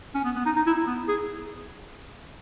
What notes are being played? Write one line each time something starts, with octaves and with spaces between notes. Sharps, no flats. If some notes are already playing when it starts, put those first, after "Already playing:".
C#4
B3
B3
D#4
D#4
E4
E4
B3
G#4